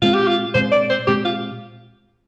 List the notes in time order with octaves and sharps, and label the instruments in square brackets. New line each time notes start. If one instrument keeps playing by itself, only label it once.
[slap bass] A#2 G#3 C4 [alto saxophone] F4
[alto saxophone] G4
F4
[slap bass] A#2 G#3 C4 [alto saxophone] C5
[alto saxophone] D5
C5
[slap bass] A#2 G#3 C4 [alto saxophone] G4
[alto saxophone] F4